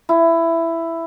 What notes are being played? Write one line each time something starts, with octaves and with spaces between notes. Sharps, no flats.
E4